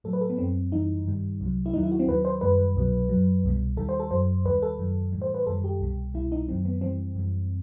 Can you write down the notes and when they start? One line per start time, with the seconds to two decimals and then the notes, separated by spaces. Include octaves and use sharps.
0.04 A2 F#3 A4
0.13 B4
0.21 A4
0.30 B3
0.38 F#2 F#3 C4
0.72 F#2 E3 G3 D#4
1.06 G2 D#3 G3
1.40 C2 C3 F#3
1.66 E4
1.73 D#2 D#3 F#3 D#4
1.83 E4
1.92 F#4
1.99 C4
2.08 D#2 D#3 F#3 B4
2.25 C5
2.41 F#2 D#3 G3 B4
2.75 C2 B2 F#3
3.09 F#2 F#3
3.44 C2 B2 G3
3.77 D#2 D#3 G3 A4
3.89 C5
4.00 A4
4.11 F#2 F#3 C5
4.44 D#2 D#3 G3 B4
4.62 A4
4.79 F#2 D#3 F#3
5.12 A2 E3 G3
5.22 C5
5.34 B4
5.46 F#2 D#3 G3 A4
5.64 G4
5.80 C2 B2 G3
6.14 C2 B2 G3 E4
6.32 D#4
6.48 F#2 D#3 F#3 C4
6.65 B3
6.81 F#2 E3 G3 C4
7.15 F#2 E3 G3